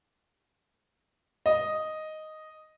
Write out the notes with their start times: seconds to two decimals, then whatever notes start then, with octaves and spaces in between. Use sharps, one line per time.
1.46 D#5